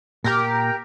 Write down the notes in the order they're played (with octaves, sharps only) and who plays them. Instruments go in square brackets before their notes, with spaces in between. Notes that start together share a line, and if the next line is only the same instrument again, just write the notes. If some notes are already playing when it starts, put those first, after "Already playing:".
[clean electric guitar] A#2 A#5 [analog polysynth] G4 A#4